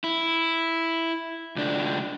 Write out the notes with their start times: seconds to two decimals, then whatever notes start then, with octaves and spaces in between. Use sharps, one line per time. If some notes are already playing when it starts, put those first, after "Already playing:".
0.04 E4
1.56 C#2 D4